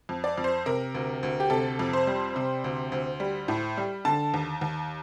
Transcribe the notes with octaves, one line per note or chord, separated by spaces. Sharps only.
F2
D5
F2
C5
C3 A#4
D2
D2
G4
C3 A4
F2
C5
G3
C3
D2
D2
G3
A2
G3
D3 A5
D#2
D#2